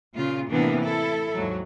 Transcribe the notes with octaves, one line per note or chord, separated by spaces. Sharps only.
A#2 C#3 F4
A2 C3 E3 A#3 B3 D4
E4 A4
D#2 G#2 F#3